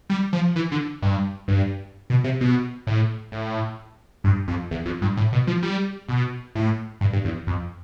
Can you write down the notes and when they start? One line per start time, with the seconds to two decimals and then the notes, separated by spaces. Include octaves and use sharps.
0.10 G3
0.33 F3
0.56 E3
0.72 D3
1.02 G2
1.48 G2
2.10 B2
2.24 C3
2.41 B2
2.87 A2
3.32 A2
4.24 G2
4.48 F2
4.71 E2
4.86 F2
5.02 G2
5.17 A2
5.33 B2
5.47 F3
5.63 G3
6.09 B2
6.55 A2
7.01 G2
7.13 G2
7.25 E2
7.47 F2